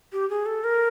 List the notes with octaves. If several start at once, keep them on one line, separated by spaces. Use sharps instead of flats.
G4
G#4
A4
A#4